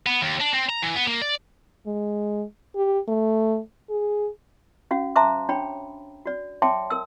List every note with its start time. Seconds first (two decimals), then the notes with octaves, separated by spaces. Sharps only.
0.06 B3
0.22 D#2
0.41 D4
0.54 C4
0.70 A#5
0.83 E3
0.96 B3
1.07 A#3
1.22 D5
1.87 G#3
2.76 G4
3.08 A3
3.90 G#4
4.91 C#4 F#4 F5
5.16 C5 E5 A5 A#5 C6 D6
5.49 D4 C#5 G5 B5
6.26 F#4 D5
6.62 C#5 E5 G5 A5 C6 D6
6.90 A#4 E6